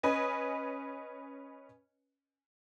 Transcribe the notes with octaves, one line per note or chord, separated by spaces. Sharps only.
C#4 B4 D#5 G#5